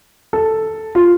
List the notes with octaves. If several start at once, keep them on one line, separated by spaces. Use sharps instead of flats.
A4
F4